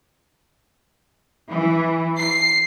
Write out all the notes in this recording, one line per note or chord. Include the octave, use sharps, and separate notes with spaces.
E3
C7